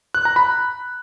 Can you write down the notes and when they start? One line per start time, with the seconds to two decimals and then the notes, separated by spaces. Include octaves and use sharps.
0.14 F#6
0.25 A#5
0.36 B5